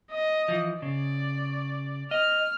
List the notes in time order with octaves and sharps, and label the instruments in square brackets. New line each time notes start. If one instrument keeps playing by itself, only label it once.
[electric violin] D#5
[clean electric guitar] E3 F3
[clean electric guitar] C#3 [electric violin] D5
[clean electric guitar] D#5 [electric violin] F6